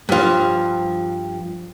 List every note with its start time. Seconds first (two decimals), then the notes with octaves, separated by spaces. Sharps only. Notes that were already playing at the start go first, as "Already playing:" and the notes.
0.09 G2 F3